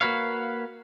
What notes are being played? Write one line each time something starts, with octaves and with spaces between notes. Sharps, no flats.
A#3 F#4 B4 C#5 F5